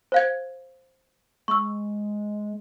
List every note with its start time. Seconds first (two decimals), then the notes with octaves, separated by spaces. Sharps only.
0.12 C5 F5 G#6
1.48 G#3 C#6 E6